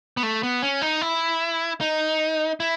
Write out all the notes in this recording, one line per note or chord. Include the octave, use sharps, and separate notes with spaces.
B3
A3
B3
C#4
D#4
E4
D#4
E4